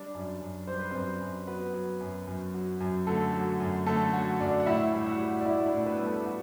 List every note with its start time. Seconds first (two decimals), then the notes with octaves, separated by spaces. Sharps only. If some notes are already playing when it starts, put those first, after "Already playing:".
Already playing: G3 D4 D5
0.15 F#2
0.41 F#2
0.67 G3 C5
0.79 B4
0.91 F#2 C4 C5
1.21 F#2
1.47 F#3 B3 B4
1.74 F#3
2.00 F#2
2.27 F#2
2.54 F#3
2.80 F#2
3.07 D3 A3 A4
3.33 F#3
3.60 F#2
3.86 D3 A3 A4
4.13 F#3 F#4
4.40 F#2 D4 D5
4.60 F#5
4.66 A2 E4 E5
4.92 G3
5.06 F#4 F#5
5.19 G3
5.41 D5
5.46 A2 E4 E5
5.66 D4 D5
5.73 A2
5.86 B3 B4
5.99 G3
6.06 A3 A4
6.26 F#4